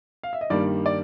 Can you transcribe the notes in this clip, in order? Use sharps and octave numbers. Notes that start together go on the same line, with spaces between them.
F5
E5
D#5
G2 D#3 G3 A#3 D5
D5